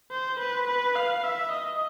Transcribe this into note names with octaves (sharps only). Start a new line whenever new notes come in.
C5
B4
B4
F5
E5
D#5